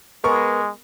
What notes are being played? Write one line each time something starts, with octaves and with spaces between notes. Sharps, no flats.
G#3 B3 A#4 C#6